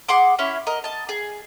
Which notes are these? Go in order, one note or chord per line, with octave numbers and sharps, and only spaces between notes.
G#4 F#5 C6 D6
C#4 E4 C#5
A#4 D#5
D#5 A5
G#4